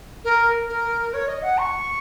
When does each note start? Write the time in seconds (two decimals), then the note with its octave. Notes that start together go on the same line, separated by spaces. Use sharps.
0.24 A#4
0.69 A#4
1.13 C#5
1.28 D#5
1.42 F#5
1.58 C#6